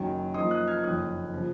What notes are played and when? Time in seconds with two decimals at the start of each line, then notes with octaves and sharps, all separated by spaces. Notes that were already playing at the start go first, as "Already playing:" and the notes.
Already playing: F#1 F#2 D#3 F#3
0.34 F#2 F3 A#3 D#4 C6 D#6
0.51 D#6 F#6
0.68 F6 G#6
0.83 F#1 F2 D#3 D#6 F#6
1.34 C#3 F3